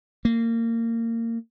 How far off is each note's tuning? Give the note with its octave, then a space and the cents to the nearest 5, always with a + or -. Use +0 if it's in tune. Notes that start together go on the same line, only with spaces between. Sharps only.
A#3 -25